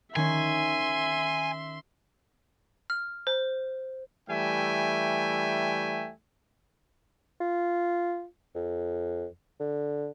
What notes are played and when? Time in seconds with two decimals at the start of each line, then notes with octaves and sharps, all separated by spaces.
0.16 D#3 C#4 E5 G#5 C6
2.90 F6
3.27 C5
4.30 E3 G3 A3 E5 G5 G#5
7.40 F4
8.55 F2
9.60 D3